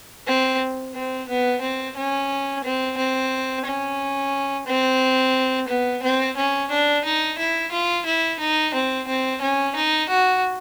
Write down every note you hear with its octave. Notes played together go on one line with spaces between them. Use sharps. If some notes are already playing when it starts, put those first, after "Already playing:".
C4
C4
B3
C4
C#4
C4
C4
C#4
C4
B3
C4
C#4
D4
D#4
E4
F4
E4
D#4
C4
C4
C#4
D#4
F#4